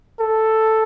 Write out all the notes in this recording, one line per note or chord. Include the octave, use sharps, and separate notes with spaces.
A4